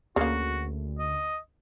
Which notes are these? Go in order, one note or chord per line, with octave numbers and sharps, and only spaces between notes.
D2 C#3 A#3 F#4
D#5